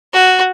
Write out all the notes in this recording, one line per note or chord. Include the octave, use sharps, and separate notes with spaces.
F#4